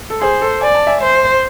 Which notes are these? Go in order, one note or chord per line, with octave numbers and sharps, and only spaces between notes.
A4
G#4 C5
A4
D5 G#5
A5
E5 G#5
C5